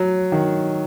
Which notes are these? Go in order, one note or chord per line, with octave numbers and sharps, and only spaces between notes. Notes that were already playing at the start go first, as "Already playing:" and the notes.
Already playing: F#3
D#3